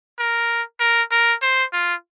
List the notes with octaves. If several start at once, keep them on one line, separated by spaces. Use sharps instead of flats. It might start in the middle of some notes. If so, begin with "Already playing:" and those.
A#4
A#4
A#4
C5
F4